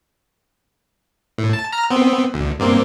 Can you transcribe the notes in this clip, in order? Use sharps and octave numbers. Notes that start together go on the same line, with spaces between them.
A2
A5
A#5 F6
B3 C4
D2
G2 A#3 C4